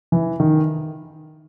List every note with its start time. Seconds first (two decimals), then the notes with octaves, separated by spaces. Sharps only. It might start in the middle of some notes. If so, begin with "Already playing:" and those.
0.12 E3
0.40 D#3